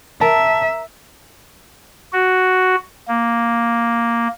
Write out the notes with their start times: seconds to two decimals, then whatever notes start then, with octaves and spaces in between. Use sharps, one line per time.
0.21 A#4 E5 A5
2.12 F#4
3.08 A#3